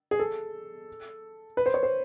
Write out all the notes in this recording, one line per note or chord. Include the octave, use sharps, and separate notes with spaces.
G#4
A4
B4
C5
C#5
C5